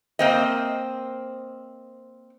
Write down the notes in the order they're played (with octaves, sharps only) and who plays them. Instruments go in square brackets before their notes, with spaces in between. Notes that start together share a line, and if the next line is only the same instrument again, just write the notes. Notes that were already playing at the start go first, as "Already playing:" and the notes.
[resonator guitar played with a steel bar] A#3 C4 D#5